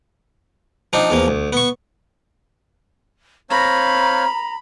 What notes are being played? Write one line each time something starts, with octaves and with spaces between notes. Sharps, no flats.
F3 C4 D4 D#4
E2 F3 A#3
D2
B3 C#6
C4 C#5 F5 A#5 B5